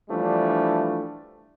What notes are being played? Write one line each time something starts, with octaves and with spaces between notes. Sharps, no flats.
E3 F3 G3 A3 D4